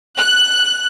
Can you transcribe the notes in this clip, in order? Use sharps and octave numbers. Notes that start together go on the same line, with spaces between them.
F#6